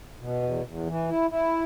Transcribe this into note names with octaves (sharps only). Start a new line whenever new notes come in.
B2
E2
E2
E3
E4
E4